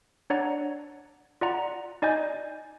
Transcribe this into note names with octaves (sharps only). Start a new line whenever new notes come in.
D4 C#5 D5 F#5 A#5
F4 D5 F#5 A#5
D#4 D5 D#5 G#5 G6